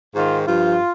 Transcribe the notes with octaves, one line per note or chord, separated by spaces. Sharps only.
G#2 D#3 F4
G2 F3 F4